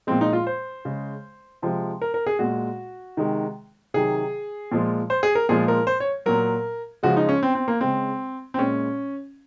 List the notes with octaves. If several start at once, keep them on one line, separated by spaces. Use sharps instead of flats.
A#2 F3 G#3 C4
D#4
F4
C5
C#3 G#3
C3 F3 G#3
A#4
A#4
G#4
A#2 G#3 F#4
C3 D#3 G#3
C3 D#3 F#3 G#4
A#2 F3 G#3
C5
G#4
A#4
A#2 F3 G#3 G#4
A#4
C5
C#5
A#2 F#3 A#4
C#3 F3 G#3 F#4
D#4
C#4
C4
C4
A#3
C#3 G#3 C4
C4
A#2 G#3 C#4